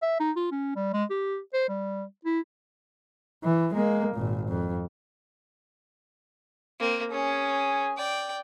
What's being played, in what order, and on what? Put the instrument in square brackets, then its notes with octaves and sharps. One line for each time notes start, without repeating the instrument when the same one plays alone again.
[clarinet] E5
D#4
F4
C#4
G3
G#3
G4
C5
G3
E4
[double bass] E3
G#3 A#3
G#1 A#2
F2
[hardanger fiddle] A#3 C4
[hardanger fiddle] C#4 [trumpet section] G#4 G#5
[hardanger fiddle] D5 G5